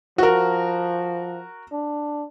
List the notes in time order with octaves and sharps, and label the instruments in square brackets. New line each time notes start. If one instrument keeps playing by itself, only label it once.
[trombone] F3 [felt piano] F#4 A#4
[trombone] D4